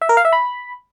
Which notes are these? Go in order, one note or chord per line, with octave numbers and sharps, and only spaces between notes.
E5
A#4
F5
E5
B5